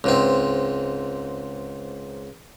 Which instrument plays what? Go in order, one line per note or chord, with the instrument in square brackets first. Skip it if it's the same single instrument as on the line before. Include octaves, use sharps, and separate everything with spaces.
[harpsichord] C#2 G#2 C4